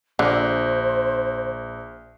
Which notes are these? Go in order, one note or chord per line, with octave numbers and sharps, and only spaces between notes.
A#1 D3 C5